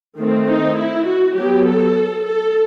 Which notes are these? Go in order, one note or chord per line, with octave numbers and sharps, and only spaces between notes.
D#3 A3 C4
D#4
E4
F#4
F#3 B3 G4
A4
A4